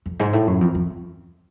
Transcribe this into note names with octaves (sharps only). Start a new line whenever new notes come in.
F2
G#2
A2
F#2
F2
F2